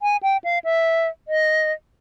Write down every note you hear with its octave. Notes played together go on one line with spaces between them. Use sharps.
G#5
G5
F5
E5
D#5